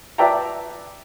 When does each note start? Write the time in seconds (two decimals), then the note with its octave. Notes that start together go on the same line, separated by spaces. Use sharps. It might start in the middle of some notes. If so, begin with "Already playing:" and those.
0.18 B4 D5 E5 G5 A5 A#5